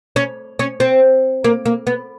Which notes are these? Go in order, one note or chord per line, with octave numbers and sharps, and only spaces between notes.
C#4
C#4
C4
A#3
A#3
B3